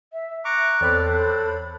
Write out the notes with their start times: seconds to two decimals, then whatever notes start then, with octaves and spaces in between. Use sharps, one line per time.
0.12 E5
0.45 A#5 C#6 D6 F#6
0.81 E2 C4 A4 C#5 D5 B5
1.06 C5